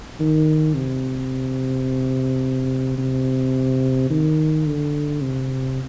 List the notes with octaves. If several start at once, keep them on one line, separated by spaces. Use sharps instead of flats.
D#3
C3
C3
D#3
D3
C3